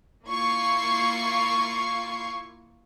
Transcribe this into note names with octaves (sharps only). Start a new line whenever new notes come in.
A#3 E4 F4 C#6 G#6 C7